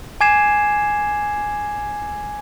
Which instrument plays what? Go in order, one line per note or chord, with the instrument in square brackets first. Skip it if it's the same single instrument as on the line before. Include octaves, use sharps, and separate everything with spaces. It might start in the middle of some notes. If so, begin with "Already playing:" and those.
[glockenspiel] G#5 D6 G#6 C7 E7